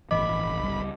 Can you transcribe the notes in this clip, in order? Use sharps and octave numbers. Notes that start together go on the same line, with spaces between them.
G1 A2 E3 F3 D#5 B5 D6
C#2 G3